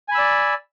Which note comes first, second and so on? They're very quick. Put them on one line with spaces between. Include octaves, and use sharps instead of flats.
G#5 B5 E6 D5